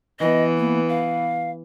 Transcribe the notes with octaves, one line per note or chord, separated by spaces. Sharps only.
E3 B3 D#5
A#3
F5